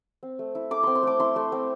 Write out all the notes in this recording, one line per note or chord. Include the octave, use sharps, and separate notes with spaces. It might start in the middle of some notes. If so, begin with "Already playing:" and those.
C4
A3
E4
A3 D6
C4 C6
C6
A3 D6
E4 C6
A3
C4